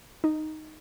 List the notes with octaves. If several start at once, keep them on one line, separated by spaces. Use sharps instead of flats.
D#4